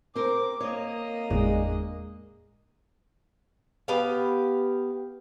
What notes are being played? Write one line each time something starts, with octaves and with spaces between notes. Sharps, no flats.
C4 A#4 D6
A#3 C#5 D#5
G1 E2 A2 G#3 D4
B3 G4 F5